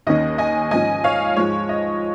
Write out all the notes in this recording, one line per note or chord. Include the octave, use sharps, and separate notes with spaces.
D#2 D#3 C#4 D#5
D#5 G#5
G#2 F3 C#4 D#5 G#5
C#5 F5
G#2 F3 G#3 C#5
D#5